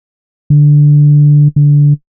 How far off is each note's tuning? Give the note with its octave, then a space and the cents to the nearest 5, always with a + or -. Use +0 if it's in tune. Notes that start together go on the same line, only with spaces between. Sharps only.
D3 +0
D3 -15